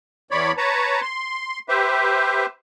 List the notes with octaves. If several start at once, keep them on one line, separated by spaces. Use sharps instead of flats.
E2 C#5 D5 B5
B4 C#5 A5 A#5
C6
G4 B4 C5 E5